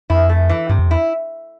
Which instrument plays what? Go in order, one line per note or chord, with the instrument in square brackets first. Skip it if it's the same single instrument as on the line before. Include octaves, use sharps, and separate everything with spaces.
[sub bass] F2 [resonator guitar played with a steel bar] E4
[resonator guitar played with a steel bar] A3
E3
[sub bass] G2 [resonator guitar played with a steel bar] C3
[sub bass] F2
[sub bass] E2 [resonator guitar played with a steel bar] E4